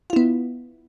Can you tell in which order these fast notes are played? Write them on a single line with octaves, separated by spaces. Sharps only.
F4 E4 B3